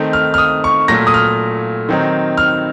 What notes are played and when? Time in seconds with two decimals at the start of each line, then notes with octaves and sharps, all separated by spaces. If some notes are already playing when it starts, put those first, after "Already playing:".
Already playing: D#3 A3 C4 D#4
0.13 F6
0.34 F6
0.38 D#6
0.64 C#6
0.88 A#2 F#3 A3 A#6
1.07 D#6
1.14 F6
1.89 D#3 F#3 C4 D#4
2.37 F6